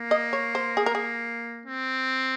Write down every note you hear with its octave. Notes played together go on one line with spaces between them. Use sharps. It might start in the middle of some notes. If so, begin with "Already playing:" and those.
Already playing: A#3
D#5
C#5
C5
G#4
A#4
G#4
C4